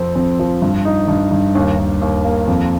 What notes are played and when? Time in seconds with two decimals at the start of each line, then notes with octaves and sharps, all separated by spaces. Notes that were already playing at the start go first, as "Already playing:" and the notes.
Already playing: F2 C4
0.15 F2
0.39 F3
0.62 G2
0.85 D#4
1.08 G2
1.32 G2
1.55 D#2
1.78 D#2
2.02 D#2
2.25 A#3
2.48 F2